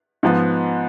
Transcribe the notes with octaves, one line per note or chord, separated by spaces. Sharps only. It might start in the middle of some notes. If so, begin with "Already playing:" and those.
G#2 F3 B3